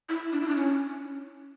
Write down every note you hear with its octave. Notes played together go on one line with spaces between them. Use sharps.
E4
D4
E4
D4
C#4